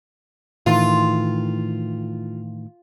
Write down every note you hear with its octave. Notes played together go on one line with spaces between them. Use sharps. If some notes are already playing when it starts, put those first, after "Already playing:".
A2 D#3 E3 F4